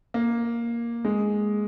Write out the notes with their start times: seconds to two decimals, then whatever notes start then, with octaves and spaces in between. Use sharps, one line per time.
0.14 A#3
1.05 G#3